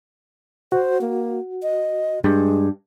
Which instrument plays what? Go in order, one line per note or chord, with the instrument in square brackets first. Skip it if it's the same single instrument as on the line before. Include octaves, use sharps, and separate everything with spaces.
[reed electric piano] F#4 [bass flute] C5
[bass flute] A#3
D#5
[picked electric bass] G2 [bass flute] G#3